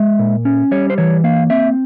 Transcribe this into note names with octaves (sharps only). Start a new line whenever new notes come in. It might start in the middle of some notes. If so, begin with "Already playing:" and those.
Already playing: G#3 E5
A#2
C#4
G3 C#5
C5
E3 C#5
A#3 F5
C4 E5